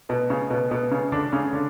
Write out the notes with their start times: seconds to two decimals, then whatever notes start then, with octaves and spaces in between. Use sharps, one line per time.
0.09 B2 B3
0.30 C#3 C#4
0.50 B2 B3
0.71 B2 B3
0.91 C#3 C#4
1.12 D3 D4
1.32 C#3 C#4
1.53 D3 D4